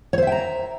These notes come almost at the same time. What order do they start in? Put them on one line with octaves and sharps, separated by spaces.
C#5 C5 E5 G5 A#5